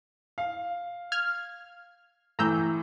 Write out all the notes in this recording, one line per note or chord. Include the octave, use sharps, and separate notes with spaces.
F5
F6 G#6
A2 E3 A#5 E6 G6